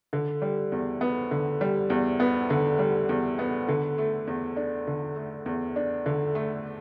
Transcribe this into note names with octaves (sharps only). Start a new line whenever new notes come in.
D3
G3
E2
B3
D3
G3
E2
B3
D3
G3
E2
B3
D3
A3
E2
D4
D3
A3
E2
D4
D3
A3